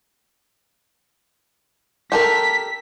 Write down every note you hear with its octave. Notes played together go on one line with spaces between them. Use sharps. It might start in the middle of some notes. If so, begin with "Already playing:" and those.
G4 A4 A#4 B6